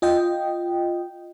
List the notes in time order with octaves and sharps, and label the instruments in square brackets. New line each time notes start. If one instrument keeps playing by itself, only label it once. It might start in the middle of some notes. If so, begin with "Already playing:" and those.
[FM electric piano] F4 D#5 G5